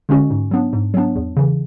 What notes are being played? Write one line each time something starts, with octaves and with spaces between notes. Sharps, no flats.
D3 G#3 C#4 F#4
G#2
F#3 B3 D4
G#2
F#3 B3 D4
E2
C#3 E3